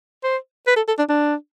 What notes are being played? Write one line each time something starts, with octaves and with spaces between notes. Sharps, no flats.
C5
B4
A4
A4
D4
D4